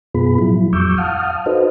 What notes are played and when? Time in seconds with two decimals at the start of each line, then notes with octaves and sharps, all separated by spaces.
0.15 F#2 B2 B3 F4 G#4 B5
0.38 A2 F3 F#3 E4
0.73 F2 F#3 C#6 D6 E6 G6
0.98 F5 F#5 A5 D#6 F6
1.46 D#4 F#4 A4 B4 C5 D#5